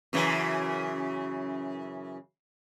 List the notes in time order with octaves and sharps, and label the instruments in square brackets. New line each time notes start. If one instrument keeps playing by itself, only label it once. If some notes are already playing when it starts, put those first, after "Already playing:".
[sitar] F#2 C#3 E3